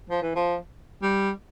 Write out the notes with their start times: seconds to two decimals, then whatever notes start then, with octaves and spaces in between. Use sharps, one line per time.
0.10 F3
0.22 E3
0.36 F3
1.02 G3